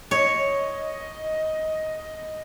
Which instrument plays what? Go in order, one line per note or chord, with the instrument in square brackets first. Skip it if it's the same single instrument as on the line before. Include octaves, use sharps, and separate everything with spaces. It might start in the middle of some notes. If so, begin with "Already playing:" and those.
[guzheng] C#5 [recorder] D#5